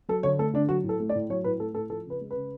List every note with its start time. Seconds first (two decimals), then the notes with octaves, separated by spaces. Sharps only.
0.09 F#3 A4
0.23 D3 C#5
0.39 A3 A4
0.54 D3 D4
0.69 F#3 F#4
0.84 A2
0.89 A4
1.00 A3
1.09 D5
1.15 A2
1.30 F#3 C#5
1.44 A2 B4
1.60 A3 A4
1.75 A2 A4
1.90 F3 A4
2.06 C#3 B4
2.21 G#3
2.31 B4
2.36 C#3